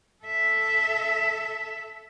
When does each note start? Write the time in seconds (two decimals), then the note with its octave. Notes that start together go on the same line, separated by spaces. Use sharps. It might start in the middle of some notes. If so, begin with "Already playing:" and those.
0.24 A4 E5